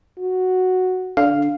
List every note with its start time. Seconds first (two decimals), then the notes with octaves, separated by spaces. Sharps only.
0.18 F#4
1.17 D3 F5